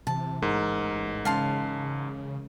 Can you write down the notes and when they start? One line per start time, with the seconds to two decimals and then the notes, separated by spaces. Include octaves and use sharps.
0.07 C3 E3 A5
0.42 A1 G#2 A#4
1.25 C#3 G#3 C#4 F5 A5 C6